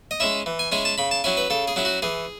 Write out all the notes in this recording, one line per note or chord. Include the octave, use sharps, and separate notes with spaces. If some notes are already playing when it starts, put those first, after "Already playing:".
D#5
G#3 C#4 E4 E5
E3
G#5
G#3 C#4 E4 G#5
A5
C#3 B5
A5
F#3 C#4 E4 G#5
B4
C#3 A4
G#4
F#3 C#4 E4
F#4
E3 G#4